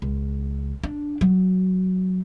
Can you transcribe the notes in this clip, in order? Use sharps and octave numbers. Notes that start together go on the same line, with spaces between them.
C#2
D4
F#3